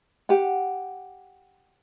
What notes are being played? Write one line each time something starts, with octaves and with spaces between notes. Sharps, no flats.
G4 F#5